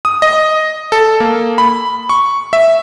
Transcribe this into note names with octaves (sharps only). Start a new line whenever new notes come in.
D#6
D#5
A4
A#3
B5
C#6
E5